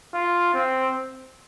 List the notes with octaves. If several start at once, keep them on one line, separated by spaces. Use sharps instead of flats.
F4
C4